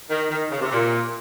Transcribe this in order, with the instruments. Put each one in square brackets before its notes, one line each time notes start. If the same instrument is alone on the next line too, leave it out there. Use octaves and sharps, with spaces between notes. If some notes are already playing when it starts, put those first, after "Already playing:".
[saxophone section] D#3
D#3
C#3
C3
A#2